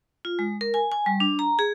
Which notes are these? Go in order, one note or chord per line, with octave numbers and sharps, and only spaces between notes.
F4
G#3
A#4
G#5
G#5
G3
D4
A#5
G#4